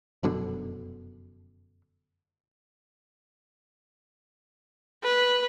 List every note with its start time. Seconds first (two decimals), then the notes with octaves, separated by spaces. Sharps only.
0.23 F1 F#2 B2 D3
5.04 B4